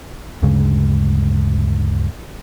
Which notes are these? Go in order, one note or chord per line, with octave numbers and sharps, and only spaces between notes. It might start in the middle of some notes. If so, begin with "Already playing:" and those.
D2 G2 C#3 G#3